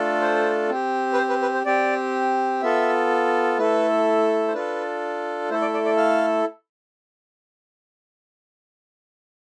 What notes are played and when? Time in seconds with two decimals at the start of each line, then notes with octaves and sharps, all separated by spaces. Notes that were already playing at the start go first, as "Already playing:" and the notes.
Already playing: A3 D4 F4 A4
0.22 C5
0.69 C4 G4
1.13 B4
1.18 C5
1.29 B4
1.42 B4
1.54 C5
1.65 C4 G4 D5
2.62 B3 F4 A4 E5
3.58 A3 E4 A4 B4
4.48 C5
4.53 D4 F4 A4 B4
5.50 A3 E4 A4 C5
5.61 D5
5.74 D5
5.85 D5
5.97 F5